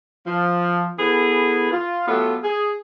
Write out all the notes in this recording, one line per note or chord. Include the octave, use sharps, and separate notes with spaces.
F3
E3 B3 G#4 A4 B4
F4
F#3 A3 B3 F4 G4 A4
G#4